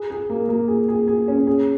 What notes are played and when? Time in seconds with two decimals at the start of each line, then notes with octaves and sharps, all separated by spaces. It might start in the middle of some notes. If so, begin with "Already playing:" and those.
Already playing: G#4
0.10 G#4
0.30 A#3
0.49 A#3
0.68 G#4
0.88 G#4
1.08 G#4
1.28 C#4
1.47 G#4